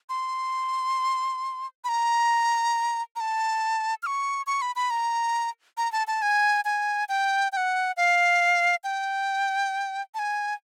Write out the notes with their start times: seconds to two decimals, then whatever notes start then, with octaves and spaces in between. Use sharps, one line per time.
0.09 C6
1.84 B5
1.89 A#5
3.16 A#5
3.20 A5
4.03 F6
4.06 C#6
4.47 C#6
4.62 B5
4.76 B5
4.90 A#5
5.77 A#5
5.92 A5
6.07 A5
6.22 G#5
6.65 G#5
7.09 G5
7.52 G5
7.57 F#5
7.97 F5
8.84 G5
10.14 A5
10.19 G#5